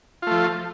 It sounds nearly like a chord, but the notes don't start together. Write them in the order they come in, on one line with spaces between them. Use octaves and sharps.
F4 A3 F3